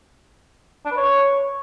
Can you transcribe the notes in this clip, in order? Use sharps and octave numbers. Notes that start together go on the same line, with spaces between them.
D4
B4
C#5